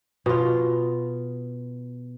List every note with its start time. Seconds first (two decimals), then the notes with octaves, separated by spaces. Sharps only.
0.26 B2 F4